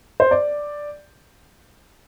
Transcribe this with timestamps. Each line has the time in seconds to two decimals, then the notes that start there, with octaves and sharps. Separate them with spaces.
0.20 C5
0.31 D5